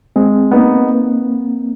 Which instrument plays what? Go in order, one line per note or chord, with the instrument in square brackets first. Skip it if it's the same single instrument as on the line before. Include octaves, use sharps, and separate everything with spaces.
[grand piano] G#3 [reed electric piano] C4
[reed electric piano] A#3 [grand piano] B3 D#4